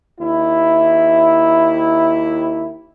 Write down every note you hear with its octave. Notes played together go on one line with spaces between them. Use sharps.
D#2 E4